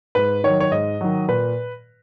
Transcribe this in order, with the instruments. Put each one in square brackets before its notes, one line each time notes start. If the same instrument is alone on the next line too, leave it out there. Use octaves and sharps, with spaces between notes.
[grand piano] G#2 B4
D#3 F#3 C#5
C#5
G#2 D#5
D#3 F#3
A#2 B4